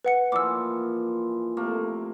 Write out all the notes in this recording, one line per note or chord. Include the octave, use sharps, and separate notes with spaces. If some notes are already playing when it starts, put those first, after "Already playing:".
B4 F#5 C#7
A#2 E3 F3 D6 E6
C3 A3 A#3